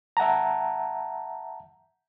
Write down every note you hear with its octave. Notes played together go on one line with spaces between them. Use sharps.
E5 F#5 A5 A#5